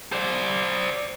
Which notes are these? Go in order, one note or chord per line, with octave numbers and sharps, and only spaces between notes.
C5 D5